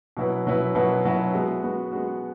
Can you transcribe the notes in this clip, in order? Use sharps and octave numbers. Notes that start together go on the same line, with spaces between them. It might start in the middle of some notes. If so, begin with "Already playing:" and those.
B2 F#3 E4 B4
B2 F#3 E4 B4
B2 F#3 E4 B4
B2 F#3 E4 B4
G#3 B3 F#4
G#3 B3 F#4
G#3 B3 F#4